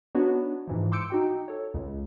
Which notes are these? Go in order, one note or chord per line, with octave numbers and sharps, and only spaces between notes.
B3 D4 D#4 F#4 B4 C#5
G#2 E3 F3
C6 D6 E6 G6 C#7 D7
D#4 F#4 G5
A4 C#5
C#2